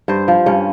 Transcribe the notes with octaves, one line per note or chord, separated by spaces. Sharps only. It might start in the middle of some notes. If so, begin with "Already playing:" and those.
G2 C5
F3
G2 C#4